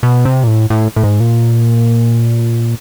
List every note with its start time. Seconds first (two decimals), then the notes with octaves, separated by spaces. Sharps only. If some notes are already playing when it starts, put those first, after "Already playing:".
0.03 B2
0.25 C3
0.44 A#2
0.47 A2
0.70 A2
0.96 A2
1.03 G#2
1.20 A#2